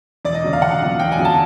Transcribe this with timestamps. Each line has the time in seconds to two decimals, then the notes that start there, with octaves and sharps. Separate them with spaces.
0.25 E1 D5
0.34 D#5
0.44 D2 C#3 F#3
0.53 F5
0.62 E1 F#5
0.81 D2 C#3 F#3
1.00 E1 G5
1.12 G#5
1.18 D2 C#3 F#3
1.25 A5